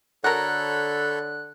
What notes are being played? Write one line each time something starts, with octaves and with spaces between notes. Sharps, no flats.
D3 F#4 A4 A#4 C#5 B5 F#6